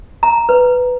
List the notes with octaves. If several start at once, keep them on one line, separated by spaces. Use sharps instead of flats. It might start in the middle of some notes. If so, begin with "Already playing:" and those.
A#5
B4